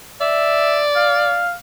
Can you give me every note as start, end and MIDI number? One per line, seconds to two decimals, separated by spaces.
0.21 1.46 74
0.21 0.83 76
0.96 1.53 77